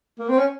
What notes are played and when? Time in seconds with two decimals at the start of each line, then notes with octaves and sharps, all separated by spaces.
0.19 A#3
0.29 C4
0.38 C#4